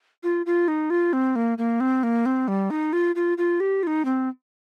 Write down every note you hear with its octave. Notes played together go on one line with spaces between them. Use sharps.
F4
F4
D#4
F4
C4
A#3
A#3
C4
A#3
C4
G3
D#4
F4
F4
F4
G4
F4
D#4
C4